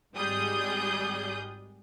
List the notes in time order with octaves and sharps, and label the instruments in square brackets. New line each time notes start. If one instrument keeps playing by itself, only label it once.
[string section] G#1 G3 G#3 G#4 D#6 G6